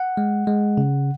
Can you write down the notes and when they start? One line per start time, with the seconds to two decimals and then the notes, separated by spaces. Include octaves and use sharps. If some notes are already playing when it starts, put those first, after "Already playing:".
Already playing: F#5
0.17 G#3
0.47 G#3
0.78 C#3